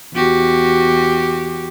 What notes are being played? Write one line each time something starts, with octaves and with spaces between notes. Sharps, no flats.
E2 F#4 G4